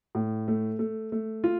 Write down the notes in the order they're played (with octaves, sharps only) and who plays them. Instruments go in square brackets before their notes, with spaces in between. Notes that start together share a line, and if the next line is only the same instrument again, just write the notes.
[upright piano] A2
A3
A3
A3
F4